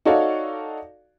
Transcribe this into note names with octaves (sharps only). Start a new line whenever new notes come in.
D#4 F#4 A4 C#5 D5 F5